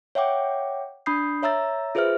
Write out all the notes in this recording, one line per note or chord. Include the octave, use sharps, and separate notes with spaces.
C#5 E5 F#5 G5 D6
D4 B5 D#6 G6 C7
C#5 E5 A#5 E6 A6
F4 G#4 B4 C5 E5 F6